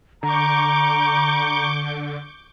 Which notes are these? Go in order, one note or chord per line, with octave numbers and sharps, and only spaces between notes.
D3 A#5 C#6 D6 G6